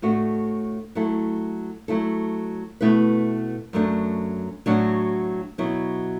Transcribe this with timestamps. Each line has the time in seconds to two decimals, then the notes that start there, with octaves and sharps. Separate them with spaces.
0.02 A2 A3 D4 F#4
0.95 F#3 A3 E4 A4
1.88 F#3 A3 E4 A4
2.81 B2 A3 E4 B4
3.73 F#2 F#3 A3 D4
4.66 A2 F#3 D4 F#4
5.58 B2 F#3 B3 E4